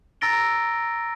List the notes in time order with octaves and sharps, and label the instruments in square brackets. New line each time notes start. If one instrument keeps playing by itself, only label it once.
[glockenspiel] A#5 E6 A6 A#6 D7 G7